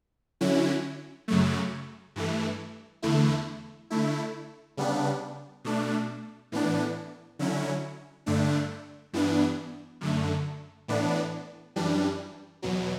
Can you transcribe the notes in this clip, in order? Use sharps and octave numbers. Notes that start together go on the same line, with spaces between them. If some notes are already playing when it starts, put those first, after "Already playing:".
D3 F#3 C#4 E4
F#2 C#3 F#3 A3
G2 E3 A3
E2 D3 A3 E4
D3 A3 E4
C#3 G3 B3 D4
B2 A3 D4
A2 E3 B3 D4
D3 F#3 C#4 E4
G2 D3 A3 D4
G2 E3 B3 D4
F#2 D3 A3
A2 E3 B3 D4
F#2 E3 G3 D4
E2 B2 F#3